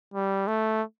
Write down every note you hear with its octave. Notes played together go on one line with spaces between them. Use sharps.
G3
A3